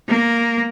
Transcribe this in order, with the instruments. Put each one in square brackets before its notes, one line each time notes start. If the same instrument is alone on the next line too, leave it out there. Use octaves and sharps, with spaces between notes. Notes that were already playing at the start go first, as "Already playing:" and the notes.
[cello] A#3